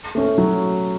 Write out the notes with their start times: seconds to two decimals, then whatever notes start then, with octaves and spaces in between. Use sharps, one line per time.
0.15 A3 C#4
0.38 F#3